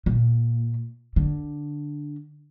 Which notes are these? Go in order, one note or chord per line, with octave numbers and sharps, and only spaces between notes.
A#2
D3